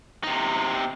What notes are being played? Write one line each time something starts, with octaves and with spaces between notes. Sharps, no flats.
C3 D#4